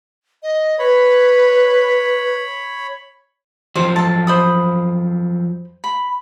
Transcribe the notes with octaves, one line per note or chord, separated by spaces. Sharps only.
D#5
B4 C#5 B5
F2 F3 F#3 C5 G5
A4 A5
C5 B5 D#6
B5